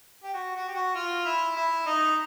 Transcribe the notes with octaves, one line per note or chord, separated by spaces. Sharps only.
G4
F#4
F#4
G4
F#4
F4
E4
E4
D#4